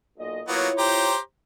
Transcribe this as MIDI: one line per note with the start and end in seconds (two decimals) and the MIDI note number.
0.18 0.41 35
0.18 0.41 46
0.18 0.41 75
0.48 0.68 54
0.48 0.68 58
0.48 0.68 59
0.48 1.14 64
0.48 1.14 65
0.48 1.14 73
0.78 1.18 67
0.78 1.18 72
0.78 1.18 82